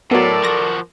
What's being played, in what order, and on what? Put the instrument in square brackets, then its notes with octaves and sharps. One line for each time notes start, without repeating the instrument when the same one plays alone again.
[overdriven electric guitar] A2 [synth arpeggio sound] F#3 B3 [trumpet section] A4 D5 [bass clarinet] A#4
[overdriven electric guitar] F3 F#4 [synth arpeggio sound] A6 A#6